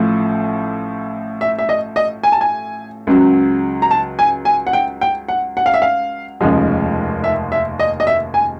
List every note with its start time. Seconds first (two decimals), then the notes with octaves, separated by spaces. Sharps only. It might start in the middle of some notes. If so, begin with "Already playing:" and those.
Already playing: A1 A2 F3
1.41 E5
1.59 E5
1.69 D#5
1.96 D#5
2.23 G#5
2.32 A5
2.41 G#5
3.07 C#2 C#3 F#3
3.82 A#5
3.91 A5
4.19 G#5
4.45 G#5
4.67 F#5
4.73 G5
5.01 G5
5.28 F#5
5.57 F#5
5.66 F5
5.74 E5
5.82 F5
6.41 F1 D#2 C#3 F3 G#3
7.24 E5
7.52 E5
7.79 D#5
8.00 D#5
8.07 E5
8.34 G#5